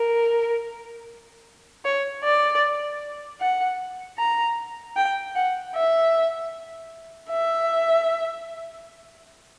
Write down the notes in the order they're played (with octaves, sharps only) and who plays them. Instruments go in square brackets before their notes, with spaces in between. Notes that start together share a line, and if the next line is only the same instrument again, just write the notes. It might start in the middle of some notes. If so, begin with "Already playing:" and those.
Already playing: [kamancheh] A#4
C#5
D5
F#5
A#5
G5
F#5
E5
E5